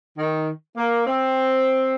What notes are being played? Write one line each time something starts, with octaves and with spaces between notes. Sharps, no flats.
D#3
A#3
C4